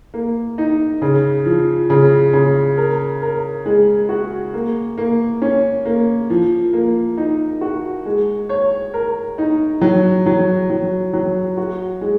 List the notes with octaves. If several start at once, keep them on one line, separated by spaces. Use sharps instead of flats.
A#3
D#4
C#3
F3
C#3
C#3
A#4
A#4
G#3
F#4
A#3
A#3
C#4
A#3
F3
A#3
D#4
F#4
G#3
C#5
A#4
D#4
F#3
F#3
F#3
F#3
F#4
G#3